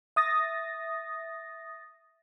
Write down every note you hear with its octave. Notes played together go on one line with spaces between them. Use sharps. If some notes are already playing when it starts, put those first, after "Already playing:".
E5 D#6 A6 A#6